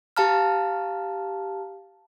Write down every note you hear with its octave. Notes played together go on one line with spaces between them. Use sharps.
G4 F5 A5 A#5 F6